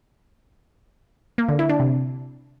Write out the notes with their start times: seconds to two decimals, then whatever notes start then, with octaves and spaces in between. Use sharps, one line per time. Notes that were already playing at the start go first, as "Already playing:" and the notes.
1.38 A#3
1.49 D3
1.59 E4
1.69 D4
1.80 C3